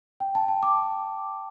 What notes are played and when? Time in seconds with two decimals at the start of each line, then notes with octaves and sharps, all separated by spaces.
0.20 G5
0.35 A5
0.48 A5
0.63 D6